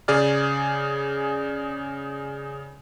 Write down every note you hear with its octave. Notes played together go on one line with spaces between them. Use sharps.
C#3 G#4 D5 F6